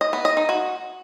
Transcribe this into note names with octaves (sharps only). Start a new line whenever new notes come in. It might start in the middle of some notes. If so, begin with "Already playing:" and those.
D#5
B3
D#5
D#4
F#4